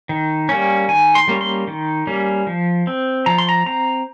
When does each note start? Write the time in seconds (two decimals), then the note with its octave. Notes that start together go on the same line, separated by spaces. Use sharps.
0.09 D#3
0.49 G3 A#3 C#4
0.88 D#3 G#5
1.15 C6
1.28 G3 A#3 C#4
1.41 C6
1.68 D#3
2.07 G3 A#3 C#4
2.47 F3
2.87 C4
3.26 F3 A#5
3.38 C6
3.49 A#5
3.66 C4 A#5